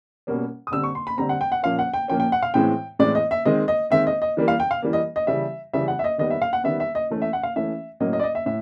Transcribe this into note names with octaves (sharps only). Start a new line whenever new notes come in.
B2 G3 A#3 C#4
D#6
D3 G3 C4 E6
C#6
C6
B5
D3 G3 C4 A#5
F#5
G5
F#5
A#2 F3 A#3 C#4 F5
F#5
G5
A#2 F3 A#3 C#4 G5
G5
F#5
F5
A2 E3 G#3 C4 G5
A2 E3 G#3 C4 D5
D#5
E5
D#3 G#3 C4 D#5
D#5
D#3 G#3 C4 E5
D#5
D#5
E3 G3 A#3
F5
G5
F5
E3 G3 A#3
D#5
D#5
C#3 E3 G3 E5
C#3 E3 G3 E5
F#5
E5
D#5
D#3 G3 B3 D#5
E5
F5
F#5
D#3 G3 B3 E5
E5
D#5
E3 A3 C#4
E5
F#5
F5
E3 A3 C#4 E5
A2 F#3 A#3 C#4 D#5
D#5
D5
D#5
E5
A2 E5